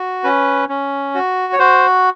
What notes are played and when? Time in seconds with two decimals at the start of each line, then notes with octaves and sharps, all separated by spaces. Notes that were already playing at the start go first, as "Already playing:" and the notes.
Already playing: F#4
0.24 C#4 B4
0.69 C#4
1.15 F#4
1.53 C#5
1.59 F#4 C5